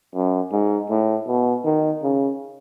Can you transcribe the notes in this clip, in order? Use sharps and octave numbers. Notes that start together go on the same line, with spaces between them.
F#2
G#2
A2
B2
D#3
C#3